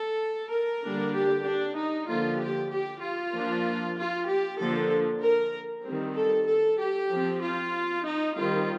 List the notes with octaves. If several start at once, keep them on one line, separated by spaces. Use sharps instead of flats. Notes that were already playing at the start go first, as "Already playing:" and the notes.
Already playing: A4
A#4
D3 G3 A#3 D4
G4
D4
D#4
D3 F3 A#3 F4
G4
G4
F4
F3 A#3 D4
F4
G4
D3 F3 A#3 D4 A4
A#4
D#3 G3 C4
A4
A4
G4
F3 C4
F4
D#4
D#3 G3 C4 F4